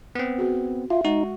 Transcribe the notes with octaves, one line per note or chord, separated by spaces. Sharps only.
B3 C4
F#4 G#4
F4 E5
G#3 D#4 F#4